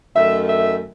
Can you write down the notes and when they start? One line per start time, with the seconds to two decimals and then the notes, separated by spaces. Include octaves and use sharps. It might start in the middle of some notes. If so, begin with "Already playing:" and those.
0.15 F#2 D#3 A3 E5
0.49 E5